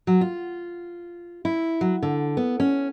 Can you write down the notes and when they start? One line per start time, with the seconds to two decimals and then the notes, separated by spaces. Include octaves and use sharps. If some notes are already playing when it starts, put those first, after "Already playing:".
0.07 F#3
0.21 F4
1.45 E4
1.81 F#3
2.02 D3
2.37 B3
2.60 C#4